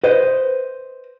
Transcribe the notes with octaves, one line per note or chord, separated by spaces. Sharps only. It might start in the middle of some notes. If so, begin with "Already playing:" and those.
B4 C5 D#5